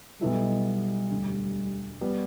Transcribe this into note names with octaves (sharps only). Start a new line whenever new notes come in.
B1 B2 G3 B3 E4 A4
E1 D2 D3
G3 B3 G4